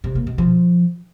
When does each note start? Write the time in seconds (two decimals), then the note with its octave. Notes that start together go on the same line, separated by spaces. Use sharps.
0.04 C3
0.15 A#3
0.27 B2
0.38 F3